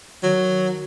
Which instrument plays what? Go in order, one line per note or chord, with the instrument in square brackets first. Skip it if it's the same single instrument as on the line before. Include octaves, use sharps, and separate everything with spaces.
[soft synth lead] D#3 [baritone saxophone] F#3